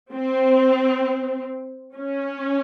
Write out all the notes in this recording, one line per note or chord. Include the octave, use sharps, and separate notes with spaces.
C4
C#4